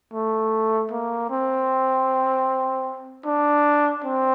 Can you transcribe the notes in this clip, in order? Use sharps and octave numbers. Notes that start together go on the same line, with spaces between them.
A3
A#3
C4
D4
C4